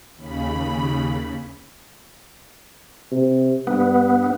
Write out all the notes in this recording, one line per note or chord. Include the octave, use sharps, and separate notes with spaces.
D#2 C#3 B5
C3
G2 B3